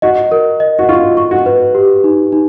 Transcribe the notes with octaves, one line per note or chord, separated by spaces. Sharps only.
F#4 D#5
A#4
D#5
F#4
F4 C#6
C#6
F#4
B4
G4
D#4
D#4